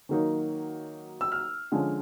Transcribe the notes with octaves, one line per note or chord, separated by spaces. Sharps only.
D#3 F#3 A#3 D#4
E6
F6
D3 F3 G#3 C#4